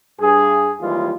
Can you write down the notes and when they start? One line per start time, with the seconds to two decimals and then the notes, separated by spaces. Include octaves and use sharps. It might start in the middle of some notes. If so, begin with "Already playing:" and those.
0.20 G2 G#4
0.81 D#2 E3 G3 G#3 F4